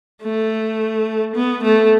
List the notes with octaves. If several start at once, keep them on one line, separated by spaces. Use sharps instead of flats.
A3
B3
A3